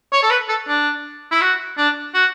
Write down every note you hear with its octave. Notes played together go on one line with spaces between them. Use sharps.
C#5
A4
B4
A4
D4
E4
F#4
D4
F#4